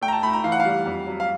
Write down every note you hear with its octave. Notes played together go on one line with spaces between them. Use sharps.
A3 G5
A#5
A5
A3 B5
A#5
E3 F5
F#5
F5
G3
F2
F#3
F5